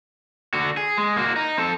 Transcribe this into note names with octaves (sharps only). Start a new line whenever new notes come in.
D3 F#4
G#4
G#3
A#3 F#4
D#4
C4 A4